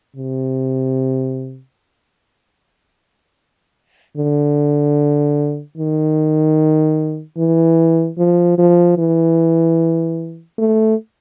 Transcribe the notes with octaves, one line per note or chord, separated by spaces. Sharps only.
C3
D3
D#3
E3
F3
F3
E3
A3